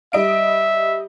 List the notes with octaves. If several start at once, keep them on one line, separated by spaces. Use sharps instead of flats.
G3 D#5 E5 D7